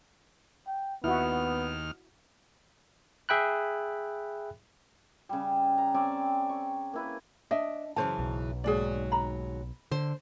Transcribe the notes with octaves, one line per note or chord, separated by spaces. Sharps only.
G5
D#2 B3 E4 F#4 F6
G#4 E5 G5 B5 F#6
C#3 G3
A#5
C4 C#4 D5 G#5
C#6
A#3 E4 B4
D4 D#5 E5
F#2 C#3 E3 C5 A5
B1
D#2 G#2 F#3 G#4 D5
A#5 B5
D3 C5